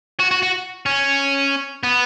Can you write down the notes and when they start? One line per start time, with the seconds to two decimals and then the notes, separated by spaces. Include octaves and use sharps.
0.20 F#4
0.31 F#4
0.43 F#4
0.86 C#4
1.83 B3